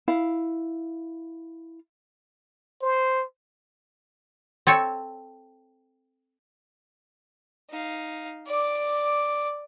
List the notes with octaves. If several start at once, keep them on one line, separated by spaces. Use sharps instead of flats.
E4 F5
C5
C4 A4 C#5
D#4 F5
D5 D6